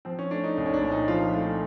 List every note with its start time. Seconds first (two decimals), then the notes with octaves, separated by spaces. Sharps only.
0.05 F3 C4
0.19 C#4
0.31 A3 D4
0.44 D#4
0.57 C2 D#4
0.66 C#4
0.74 D4
0.82 A#2
0.92 D#4
1.08 F3 F4
1.34 A3 F4